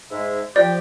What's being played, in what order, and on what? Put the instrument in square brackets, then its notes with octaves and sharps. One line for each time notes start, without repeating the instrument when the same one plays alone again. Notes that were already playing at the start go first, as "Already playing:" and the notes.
[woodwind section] G#2 G#3 E5
[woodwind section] F3 G4 [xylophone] D5